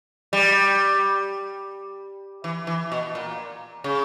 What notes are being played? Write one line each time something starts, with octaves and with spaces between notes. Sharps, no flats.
G3
E3
E3
B2
A#2
C#3